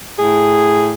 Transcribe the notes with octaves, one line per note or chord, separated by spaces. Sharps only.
A2 G#4